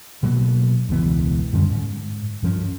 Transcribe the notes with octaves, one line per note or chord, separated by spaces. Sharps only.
B2 F#3 A#3
E1 C#2 E3 B3
F#2 D3 G3 C#4
G#2
G2 F3 C#4